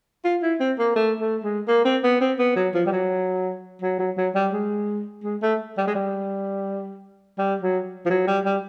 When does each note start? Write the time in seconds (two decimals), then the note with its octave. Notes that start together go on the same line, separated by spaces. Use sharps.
0.24 F4
0.42 E4
0.60 C4
0.78 A#3
0.96 A3
1.20 A3
1.44 G#3
1.68 A#3
1.85 C4
2.04 B3
2.21 C4
2.39 B3
2.56 F#3
2.74 F3
2.86 G3
2.92 F#3
3.82 F#3
3.99 F#3
4.17 F#3
4.35 G3
4.53 G#3
5.24 G#3
5.42 A3
5.78 G3
5.87 G#3
5.95 G3
7.38 G3
7.62 F#3
8.06 F3
8.10 F#3
8.27 G3
8.45 G3